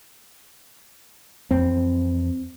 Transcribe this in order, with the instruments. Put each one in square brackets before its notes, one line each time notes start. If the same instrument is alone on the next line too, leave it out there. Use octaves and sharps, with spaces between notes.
[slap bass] F2 E3 [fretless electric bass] C4